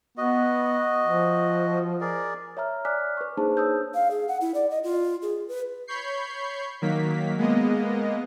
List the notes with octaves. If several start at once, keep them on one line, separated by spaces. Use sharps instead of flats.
B3 F#4 D#5
F3
G#4 A#4 D5
C#5 E5 A#5 F6
D5 G#5 D6 F6 F#6 B6
B4 C#6
A#3 D4 D#4 G#4 C5 A5
C#5 D#6 E6 G6
F5
G#4
F#5
E4
D5
D#5
F4
G#4
B4
C#5 B5 C#6 G6 C7
D#3 F#3 A#3 B6
G#3 A#3 B3 D#5